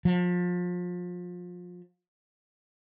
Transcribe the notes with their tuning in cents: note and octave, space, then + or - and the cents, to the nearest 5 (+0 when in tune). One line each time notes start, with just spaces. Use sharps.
F3 +30